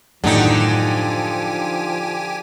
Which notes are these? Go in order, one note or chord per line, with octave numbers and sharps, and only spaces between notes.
F#2 A2 D3 D#3 F3 D#4 G4 G#5